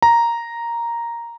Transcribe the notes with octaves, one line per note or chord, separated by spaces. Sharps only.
A#5